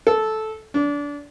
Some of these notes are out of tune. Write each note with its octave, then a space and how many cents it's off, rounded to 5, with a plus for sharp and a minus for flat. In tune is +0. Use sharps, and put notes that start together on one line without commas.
A4 -10
D4 -25